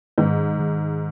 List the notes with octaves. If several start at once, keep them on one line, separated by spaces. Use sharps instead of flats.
G#2 D#3
D#3